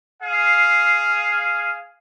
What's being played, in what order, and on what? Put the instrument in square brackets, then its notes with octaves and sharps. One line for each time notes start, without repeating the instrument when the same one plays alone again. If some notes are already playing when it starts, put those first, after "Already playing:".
[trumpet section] G#4 F5